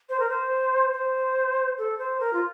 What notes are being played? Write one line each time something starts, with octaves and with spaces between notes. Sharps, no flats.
C5
A#4
C5
C5
A4
C5
A#4
F4